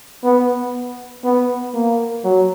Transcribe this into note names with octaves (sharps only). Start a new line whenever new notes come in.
B3
B3
A#3
F#3